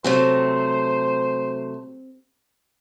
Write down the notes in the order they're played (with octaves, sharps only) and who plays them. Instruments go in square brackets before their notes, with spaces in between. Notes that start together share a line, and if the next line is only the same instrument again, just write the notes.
[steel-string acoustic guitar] C3 F#3 A3 [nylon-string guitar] C4 G4 [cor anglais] C5